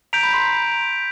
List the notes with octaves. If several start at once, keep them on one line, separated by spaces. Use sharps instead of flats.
A#5 G6 B6 D7 F7
B5
C6
A#5